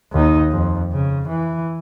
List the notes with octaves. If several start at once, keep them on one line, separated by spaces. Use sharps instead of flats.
D#2 D#4
F2
C#3
E3